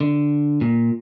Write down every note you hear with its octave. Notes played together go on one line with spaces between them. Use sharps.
D3
A#2